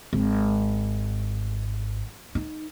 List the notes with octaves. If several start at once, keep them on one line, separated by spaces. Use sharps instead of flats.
G#1
D#4